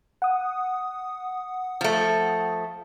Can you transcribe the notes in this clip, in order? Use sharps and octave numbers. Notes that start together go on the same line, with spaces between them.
F#5 D#6
F3 A3